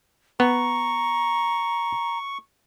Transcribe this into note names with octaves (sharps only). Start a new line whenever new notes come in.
B3 A#5 C#6